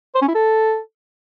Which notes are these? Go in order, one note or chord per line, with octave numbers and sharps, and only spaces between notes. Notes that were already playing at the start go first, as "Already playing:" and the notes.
C5
C#4
E4
A4